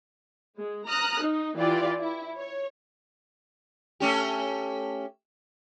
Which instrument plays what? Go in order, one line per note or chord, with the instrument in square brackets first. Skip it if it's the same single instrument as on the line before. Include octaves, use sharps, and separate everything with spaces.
[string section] G#3
A#5 D#6 F6 F#6
D#4
E3 F4 G4 D5
E4
C#5
[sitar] A3 C#4 G4